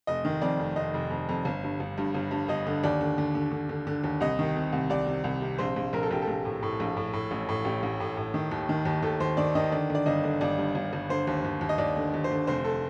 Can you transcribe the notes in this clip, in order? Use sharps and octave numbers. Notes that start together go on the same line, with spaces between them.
F1 D#5
D#3
F2 D5
F1
F1 D#5
F1
F2
F2
G1
G2
G1
G2
G1
G2
G1 D#5
D3
D#2 D5
D3
D3
D3
D3
D3
D3
D#2
C2 D#5
D#3
C3
C2
C2 D5
C3
C2
C3
A#1 C5
A#1
A#1 A#4
A4
A#1 G4
A4
A#1
A2
A2
A#1
A2
A2
A1
A2
A1 G4
A1
A2
A2
D#3
D#2
D#3
D#2
D#2 A4
D#2 C5
D#3 D5
D#3 D#5
D3 D5
D3
D5
G1 D#5
D3
G1 D5
G2
G1
G1
D3 C5
D#2
D#2
D#2
D#5
D#2 D5
D3
D#2
C5
D3
F1 C5
A4